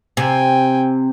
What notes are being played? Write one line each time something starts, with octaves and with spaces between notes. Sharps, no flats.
C3 G5 G#5